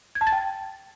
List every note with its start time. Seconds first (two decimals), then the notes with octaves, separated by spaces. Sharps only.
0.15 G#6
0.21 A5
0.27 A6
0.32 G5